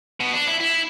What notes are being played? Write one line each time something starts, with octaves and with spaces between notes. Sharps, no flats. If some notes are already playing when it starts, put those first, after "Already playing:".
B2
D4
E4
E4